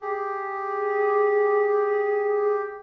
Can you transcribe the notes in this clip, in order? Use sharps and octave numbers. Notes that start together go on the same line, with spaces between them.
G4 G#4